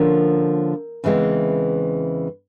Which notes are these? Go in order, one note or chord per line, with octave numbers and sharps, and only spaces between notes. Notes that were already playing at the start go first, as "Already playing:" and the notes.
Already playing: D3 F3 A#3 C#4 A#4
E2 C#3 E3 G#3 C4